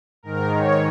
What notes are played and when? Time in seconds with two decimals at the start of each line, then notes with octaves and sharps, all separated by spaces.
0.23 G#2 D#3 A#4
0.52 C#5